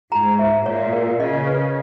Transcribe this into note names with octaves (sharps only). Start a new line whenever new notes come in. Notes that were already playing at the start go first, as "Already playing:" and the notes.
G#2 A#5
E5
A#2 C#5
A#4
C#3 D#5
B4